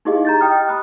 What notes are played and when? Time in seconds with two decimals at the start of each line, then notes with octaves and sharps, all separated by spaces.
0.05 D#4 E4 G4 G#4 D#5 F5
0.25 A#5 G6 A6
0.41 G4 D#5 G5 D#6 F6
0.68 B5 D#6 F#6